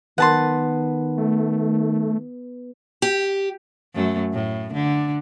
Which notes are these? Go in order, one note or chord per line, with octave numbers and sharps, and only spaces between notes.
D#3 B3 F#5 A5 C6
A3
G4
F#2 A3
A2
D3